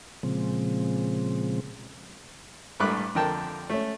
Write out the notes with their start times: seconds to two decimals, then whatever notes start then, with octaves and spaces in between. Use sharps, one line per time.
0.23 A#2 C#3 F3 G#3 C4
2.80 A1 G2 A3 B5 D6 F#6
3.15 F2 D3 A#4 G5 A5
3.70 A3 C#4